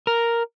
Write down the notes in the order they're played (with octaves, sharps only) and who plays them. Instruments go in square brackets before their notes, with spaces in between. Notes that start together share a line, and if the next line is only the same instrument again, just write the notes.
[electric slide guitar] A#4